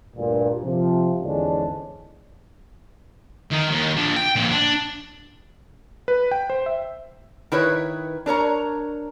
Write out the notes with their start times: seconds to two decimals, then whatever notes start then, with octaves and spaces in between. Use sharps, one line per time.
0.16 D2 G2 A#2
0.64 C3 F3
1.22 E2 G#2 D3 G#3 C#4 D4
3.51 D#3 D#4
3.70 D#2
3.97 F3 D4
4.16 G5
4.36 F2 A#2
4.51 D4
6.08 B4
6.31 G5
6.50 C5
6.66 E5
7.52 D#3 E4 B4 C#5
8.26 D4 A#4 C#5 A#5